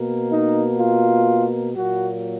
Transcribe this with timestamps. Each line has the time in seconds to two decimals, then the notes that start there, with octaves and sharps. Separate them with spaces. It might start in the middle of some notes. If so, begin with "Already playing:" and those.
Already playing: B2 A#3
0.31 D#4
0.79 F4
1.75 A#2 F#3 A#3 F#4